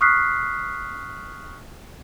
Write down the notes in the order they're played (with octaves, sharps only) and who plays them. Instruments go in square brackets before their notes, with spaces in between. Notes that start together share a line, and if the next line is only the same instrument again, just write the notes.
[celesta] C#6 D#6 F6 F#6 B6 C7